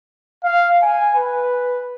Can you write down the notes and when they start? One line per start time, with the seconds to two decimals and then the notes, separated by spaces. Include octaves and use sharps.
0.44 F5
0.82 G#5
1.16 B4